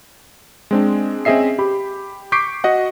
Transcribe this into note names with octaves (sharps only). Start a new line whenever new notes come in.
G#3 C4 D4
C4 C#4 G#4 D#5 E5 C7
G4 B5
C#6 D6 G6 B6 C7 D7
F#4 D#5 F#5